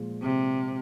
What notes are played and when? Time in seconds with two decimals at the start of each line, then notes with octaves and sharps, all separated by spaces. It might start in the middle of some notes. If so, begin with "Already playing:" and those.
Already playing: A#2 F3 G#3
0.22 C3